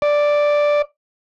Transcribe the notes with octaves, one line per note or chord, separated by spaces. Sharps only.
D5